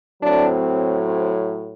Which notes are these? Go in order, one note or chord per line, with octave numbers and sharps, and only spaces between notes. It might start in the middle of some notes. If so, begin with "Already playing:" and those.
A2 F#3 C4 D4
C4